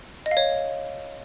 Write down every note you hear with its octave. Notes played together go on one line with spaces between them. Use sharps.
D#5
F5
C#5